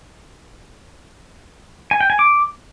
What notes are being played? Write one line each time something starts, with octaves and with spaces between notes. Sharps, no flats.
G#5
G5
G#5
D6